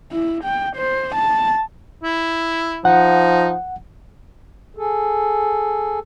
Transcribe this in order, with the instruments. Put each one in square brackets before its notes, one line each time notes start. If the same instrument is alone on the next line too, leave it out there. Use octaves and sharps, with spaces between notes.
[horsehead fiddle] E4
G5
C5
A5
[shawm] E4
[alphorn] F3 [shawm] D#4 [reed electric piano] F#5
[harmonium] G#4 A4